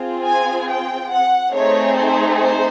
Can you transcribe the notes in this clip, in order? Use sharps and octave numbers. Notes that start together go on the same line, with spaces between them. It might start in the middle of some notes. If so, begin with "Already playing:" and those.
Already playing: C4 F4 G#4
G#5
G5
F#5
A3 C4 D#4 G#4 C#5
C5
C5